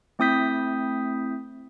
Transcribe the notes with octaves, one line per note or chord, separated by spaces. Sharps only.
A3 C4 E4 D#6 G6 B6